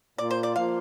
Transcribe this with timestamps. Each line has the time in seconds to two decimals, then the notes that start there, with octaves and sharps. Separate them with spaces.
0.18 A#2 A#3 F4 D5
0.31 C5
0.43 D5
0.56 F3 A#3 F4 F5